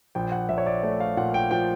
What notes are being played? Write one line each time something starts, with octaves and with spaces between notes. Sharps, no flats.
A#1 G5
F#5
A#1 E5
C#5
D5
A3 C#5
F5
A#2 F#5
G5
F3 G5